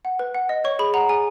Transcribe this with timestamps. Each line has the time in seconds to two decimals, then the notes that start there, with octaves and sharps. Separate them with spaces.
0.05 F#5
0.19 B4
0.34 F#5
0.49 D#5
0.64 C#5 C#6
0.79 G#4 B5
0.94 F#5 A#5
1.09 G#4 G#5